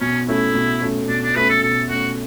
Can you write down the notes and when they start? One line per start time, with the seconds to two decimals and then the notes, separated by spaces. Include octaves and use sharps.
0.01 B2 C#4
0.28 A3 C#4 E4
0.55 B2
0.82 A3 C#4
1.09 B2 D4
1.23 D4
1.36 A3 C#4 B4
1.49 A4
1.63 B2 A4
1.90 A3 C#4 F#4